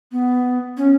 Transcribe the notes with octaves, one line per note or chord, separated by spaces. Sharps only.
B3
C#4